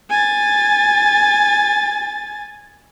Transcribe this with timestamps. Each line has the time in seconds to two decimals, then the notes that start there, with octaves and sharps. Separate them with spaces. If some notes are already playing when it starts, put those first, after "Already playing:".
0.10 G#5 A6